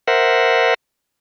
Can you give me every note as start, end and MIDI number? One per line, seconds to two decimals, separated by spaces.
0.08 0.74 70
0.08 0.74 72
0.08 0.74 76
0.08 0.74 78